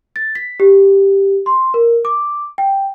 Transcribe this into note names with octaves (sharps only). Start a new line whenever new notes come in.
A6
B6
G4
C6
A#4
D6
G5